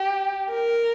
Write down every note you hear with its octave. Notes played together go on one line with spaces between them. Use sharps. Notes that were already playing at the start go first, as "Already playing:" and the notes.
Already playing: G4
A#4